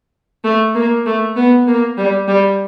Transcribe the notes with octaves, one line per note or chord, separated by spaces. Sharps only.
A3
A#3
A3
B3
A#3
G3
G3